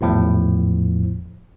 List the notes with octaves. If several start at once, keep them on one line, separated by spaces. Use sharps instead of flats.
G#1 E2 A2 F3